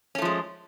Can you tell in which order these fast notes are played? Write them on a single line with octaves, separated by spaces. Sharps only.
C#4 A3 F3 G#3